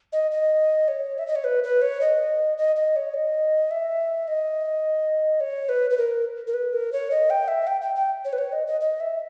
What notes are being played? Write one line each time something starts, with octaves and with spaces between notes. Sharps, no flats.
D#5
D#5
C#5
E5
D#5
C#5
B4
B4
C#5
D#5
D#5
D#5
C#5
D#5
E5
D#5
C#5
B4
B4
A#4
A#4
B4
A#4
C#5
D#5
G5
E5
G5
G5
G5
C#5
B4
C#5
D#5
D#5
D#5
E5